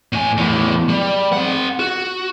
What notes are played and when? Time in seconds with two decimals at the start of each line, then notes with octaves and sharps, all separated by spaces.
0.13 A2 G#5
0.37 E2 A2
0.89 G3
1.33 C4 F#5
1.79 F#4